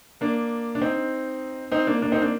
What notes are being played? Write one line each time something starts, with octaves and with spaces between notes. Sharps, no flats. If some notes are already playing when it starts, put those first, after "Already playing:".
A#3 D4
D4
C4 D#4
C4 D#4
A#3 D4
A#3 D4
C4 D#4
A#3 D4